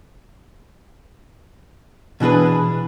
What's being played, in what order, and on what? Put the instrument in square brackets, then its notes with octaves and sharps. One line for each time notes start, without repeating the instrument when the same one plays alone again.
[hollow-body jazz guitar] B2 E3 D4 G#4 B4